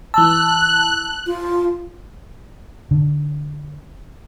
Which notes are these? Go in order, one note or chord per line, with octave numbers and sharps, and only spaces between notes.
E3 A5 E6 F#6
F4
D3